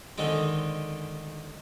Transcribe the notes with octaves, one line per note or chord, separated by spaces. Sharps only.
D3 D#3 G#3 C4